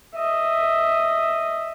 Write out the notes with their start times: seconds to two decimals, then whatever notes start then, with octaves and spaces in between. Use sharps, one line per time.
0.15 D#5 E5